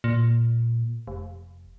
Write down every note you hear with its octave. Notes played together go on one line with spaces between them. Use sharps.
A#2
F1